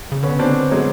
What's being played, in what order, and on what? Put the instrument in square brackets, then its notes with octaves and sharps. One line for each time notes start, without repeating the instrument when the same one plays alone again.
[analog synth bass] C#3
[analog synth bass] D3 [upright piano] B3 C#4
[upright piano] C4 D4
F#3 G#3